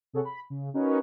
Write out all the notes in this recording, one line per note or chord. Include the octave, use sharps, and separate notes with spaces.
C3 G#4 A4 C#5 F#5
B5
C#3
C#4 D#4 F#4 A#4 B4 C#5